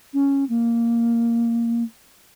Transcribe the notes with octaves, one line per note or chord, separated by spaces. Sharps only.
C#4
A#3